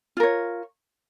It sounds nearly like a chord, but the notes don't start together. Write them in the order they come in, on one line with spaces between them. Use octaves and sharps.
F4 A#4 C#5